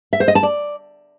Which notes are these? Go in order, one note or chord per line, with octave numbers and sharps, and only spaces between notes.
E5
C5
D#5
A5
D5